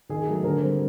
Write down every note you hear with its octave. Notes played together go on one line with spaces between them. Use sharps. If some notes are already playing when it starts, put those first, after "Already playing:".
D#3 G#4
F#3 A3
D3 A#4
G3 C4